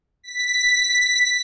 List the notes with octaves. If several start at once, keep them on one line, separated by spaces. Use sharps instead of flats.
B6